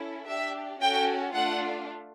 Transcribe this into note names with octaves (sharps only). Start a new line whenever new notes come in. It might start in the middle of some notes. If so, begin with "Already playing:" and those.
Already playing: C#4 E4 A4
D4 G4 E5
C#4 F#4 A4 G5
A3 D4 F4 F#5